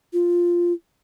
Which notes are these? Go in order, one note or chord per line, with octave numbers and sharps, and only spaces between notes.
F4